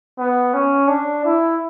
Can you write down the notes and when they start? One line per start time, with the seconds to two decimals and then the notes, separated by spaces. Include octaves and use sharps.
0.18 B3
0.54 C#4
0.88 D4
1.25 E4